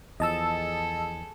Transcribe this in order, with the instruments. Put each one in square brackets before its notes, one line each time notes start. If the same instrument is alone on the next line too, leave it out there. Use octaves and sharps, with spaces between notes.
[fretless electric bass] E2 F3 [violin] G#4 A4 [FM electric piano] D#5 A5 E6